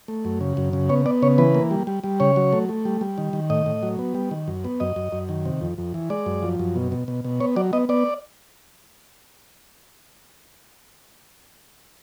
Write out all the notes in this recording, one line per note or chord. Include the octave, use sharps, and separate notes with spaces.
A3
F#2
C#3
F#2
C#3
B3 C#5
B3 D5
C#3 C#5
E3 B4
A#3
G3
G3
G3
C#3 C#5
F#3
A3
A3
G3
G3
D#3
D#3
A2 D#5
A2
F#3
B3
G3
D#3
F#2
B3
F#2 D#5
F#2
F#2
D#3
C3
F2
F2
E3
G#3 D5
F#2
F3
F#2
B2
B2
B2
B2
B3 C#5
F#3 D5
B3 D#5
B3 D5